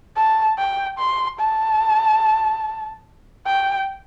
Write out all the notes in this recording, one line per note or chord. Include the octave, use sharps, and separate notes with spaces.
A5
G5
C6
A5
G5